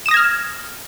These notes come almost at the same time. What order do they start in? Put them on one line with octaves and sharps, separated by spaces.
E7 D#6 A#6 G#6 F6